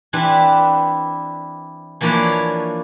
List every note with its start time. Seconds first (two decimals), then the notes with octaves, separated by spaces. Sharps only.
0.13 E3 C4 D4 E4 G4 B4
2.01 E3 F3 A#3 D4 B4 C#5